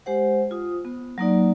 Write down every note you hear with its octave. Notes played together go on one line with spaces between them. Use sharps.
G#3 G4 C5 F#5
F4 D#6
B3
F#3 A#3 D#4 D5